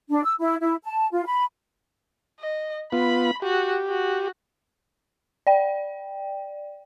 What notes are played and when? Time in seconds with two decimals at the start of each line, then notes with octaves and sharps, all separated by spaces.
0.10 D4
0.24 E6
0.40 E4
0.61 E4
0.84 A5
1.12 F4
1.25 B5
2.39 D#5
2.92 B3 F4 B5
3.42 F#4 G4
3.88 F#4
5.47 D5 G5